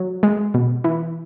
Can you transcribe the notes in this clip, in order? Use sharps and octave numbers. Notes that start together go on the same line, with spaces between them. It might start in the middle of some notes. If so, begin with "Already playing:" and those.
Already playing: F#3
G#3
B2
E3